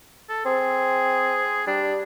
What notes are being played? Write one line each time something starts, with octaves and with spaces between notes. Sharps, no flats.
A4
C4 G#4
G3 D4